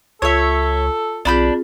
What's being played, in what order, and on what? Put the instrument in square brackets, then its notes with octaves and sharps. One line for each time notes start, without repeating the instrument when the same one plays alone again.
[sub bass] C#2 [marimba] F4 [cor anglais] A4 [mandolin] C#5 E5
[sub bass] B1 [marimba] C4 F4 G#4 [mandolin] D4 B5 G6